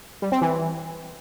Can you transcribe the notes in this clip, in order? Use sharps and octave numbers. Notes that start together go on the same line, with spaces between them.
G3
C4
E3